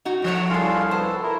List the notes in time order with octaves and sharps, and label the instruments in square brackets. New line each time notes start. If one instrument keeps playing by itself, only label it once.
[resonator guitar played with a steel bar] D#4 F#4
[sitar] A2 F3 C#5
[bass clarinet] C2 [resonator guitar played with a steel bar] D4 A4 [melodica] F4 G#4 F5
[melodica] B3 A4 A5 [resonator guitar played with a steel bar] C5
[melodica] E4 [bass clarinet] A#4